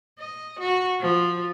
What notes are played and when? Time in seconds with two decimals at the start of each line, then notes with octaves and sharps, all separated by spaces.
0.19 D#5
0.60 F#4
1.01 F3